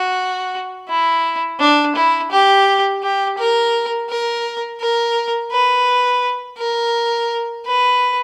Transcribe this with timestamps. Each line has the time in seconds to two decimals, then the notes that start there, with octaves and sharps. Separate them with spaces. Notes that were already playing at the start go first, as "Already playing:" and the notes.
Already playing: F#4
0.89 E4
1.60 D4
1.96 E4
2.31 G4
3.03 G4
3.38 A#4
4.09 A#4
4.80 A#4
5.52 B4
6.58 A#4
7.65 B4